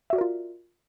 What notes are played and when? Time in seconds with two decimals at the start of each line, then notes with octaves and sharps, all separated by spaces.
0.10 E5
0.13 F#4
0.16 D5
0.18 A#4
0.21 F4